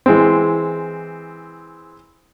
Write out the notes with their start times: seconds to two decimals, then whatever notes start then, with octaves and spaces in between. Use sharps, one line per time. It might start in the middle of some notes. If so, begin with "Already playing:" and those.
0.06 E3 G#3 C4